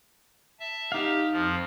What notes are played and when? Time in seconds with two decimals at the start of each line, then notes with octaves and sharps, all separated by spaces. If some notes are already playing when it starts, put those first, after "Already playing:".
0.60 E5 A5
0.92 D#4 G4 F5
1.32 F2 F3